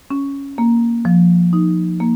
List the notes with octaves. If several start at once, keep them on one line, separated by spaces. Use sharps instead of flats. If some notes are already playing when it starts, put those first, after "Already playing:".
C#4
A#3
F3
D#4
A#3